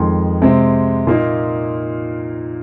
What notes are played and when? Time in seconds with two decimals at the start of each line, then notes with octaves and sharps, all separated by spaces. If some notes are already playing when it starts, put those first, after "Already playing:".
Already playing: F2 D#3 G#3 C6
0.42 C3 G#3 C4
1.07 A#2 A#3 D#4